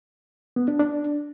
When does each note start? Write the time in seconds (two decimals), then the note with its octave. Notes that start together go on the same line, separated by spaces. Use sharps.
0.56 B3
0.68 D4
0.79 D4